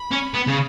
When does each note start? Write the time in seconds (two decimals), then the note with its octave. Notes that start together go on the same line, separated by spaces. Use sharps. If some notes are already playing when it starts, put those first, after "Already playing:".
Already playing: B5
0.12 C#4
0.34 B3
0.47 C#3